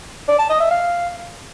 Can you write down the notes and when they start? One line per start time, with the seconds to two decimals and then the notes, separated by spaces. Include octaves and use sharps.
0.28 D5
0.39 A5
0.50 D#5
0.60 E5
0.71 F5